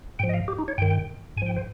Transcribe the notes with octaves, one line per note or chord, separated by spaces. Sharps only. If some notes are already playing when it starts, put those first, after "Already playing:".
G#2 F3 G5
D#5
F5
G4
D#4
C#5
G2 D#3 G5
G#2 G#5
F3 G5
C5